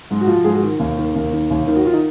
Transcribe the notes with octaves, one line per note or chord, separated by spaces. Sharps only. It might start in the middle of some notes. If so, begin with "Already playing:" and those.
G#2
F#4
F3 F4
G#2 G#4
F#4
D#3
D#2
D#3
D#2
D#3
D#2
D#3
F#4
D#3 F4
D#4